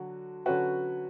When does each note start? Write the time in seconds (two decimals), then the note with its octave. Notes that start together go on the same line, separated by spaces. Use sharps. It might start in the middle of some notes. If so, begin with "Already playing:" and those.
Already playing: D3 F#3 F#4
0.46 D3 F#3 C#4 F#4 B4